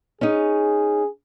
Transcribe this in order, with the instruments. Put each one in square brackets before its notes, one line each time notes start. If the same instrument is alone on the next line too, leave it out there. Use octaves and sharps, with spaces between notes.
[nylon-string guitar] C#4 D#4 [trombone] G#4